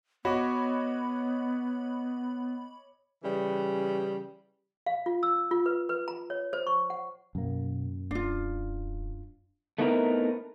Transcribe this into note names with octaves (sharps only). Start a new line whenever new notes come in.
B3 F#4 C#5 D#5 B5 D6
C#3 E3 G3
F5
F4
E6
F4
B4
B4
A#5
C#5
C5
C#6
F#5
F#2 B2 A#3
D#1 D4 F4
A3 B3 C4 D#4 E4 A#4